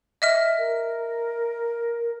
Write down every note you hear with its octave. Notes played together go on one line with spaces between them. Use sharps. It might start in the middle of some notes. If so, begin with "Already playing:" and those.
D#5 E5 F6
A#4